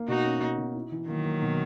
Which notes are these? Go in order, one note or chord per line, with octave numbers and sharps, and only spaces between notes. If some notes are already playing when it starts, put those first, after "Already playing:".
Already playing: A#3
B2 D#4 F#4
C#4
A#3
B2
E4
E3
D#3 F#3 A#3
A#3
B2